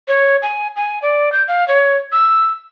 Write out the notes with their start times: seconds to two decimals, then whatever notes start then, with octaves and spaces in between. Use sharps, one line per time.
0.08 C#5
0.42 G#5
0.76 G#5
1.02 D5
1.32 G6
1.48 F5
1.68 C#5
2.12 E6